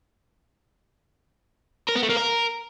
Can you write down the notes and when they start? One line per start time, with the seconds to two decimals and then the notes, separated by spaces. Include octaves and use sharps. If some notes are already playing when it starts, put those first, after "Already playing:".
1.89 A#4
1.96 B3
2.03 A3
2.10 A#3
2.17 A#4